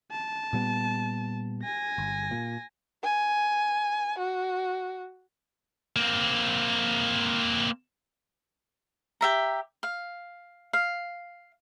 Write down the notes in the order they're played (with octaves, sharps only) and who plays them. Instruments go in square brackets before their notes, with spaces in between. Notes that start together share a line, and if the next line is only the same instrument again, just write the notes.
[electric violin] A5
[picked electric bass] A#2 G3 B3
[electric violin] G#5 A#6
[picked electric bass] G1
A#2
[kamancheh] G#5
F#4
[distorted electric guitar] A#3 C4
[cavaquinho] G4 E5 A#5
F5
F5